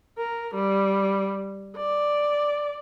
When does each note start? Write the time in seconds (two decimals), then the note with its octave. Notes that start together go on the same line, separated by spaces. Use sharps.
0.18 A#4
0.54 G3
1.76 D5